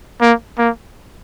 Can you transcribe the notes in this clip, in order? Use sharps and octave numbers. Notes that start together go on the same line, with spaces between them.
A#3
A#3